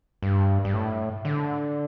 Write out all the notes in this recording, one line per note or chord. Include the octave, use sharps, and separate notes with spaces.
G2
G2
A2
D3